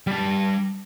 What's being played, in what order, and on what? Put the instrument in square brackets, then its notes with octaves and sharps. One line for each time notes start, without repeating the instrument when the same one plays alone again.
[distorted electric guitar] G3 A5